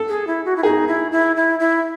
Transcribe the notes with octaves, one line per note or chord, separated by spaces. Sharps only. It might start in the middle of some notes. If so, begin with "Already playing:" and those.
Already playing: A4
G#4
E4
F#4
E4
D#4 G#4
E4
E4
E4
E4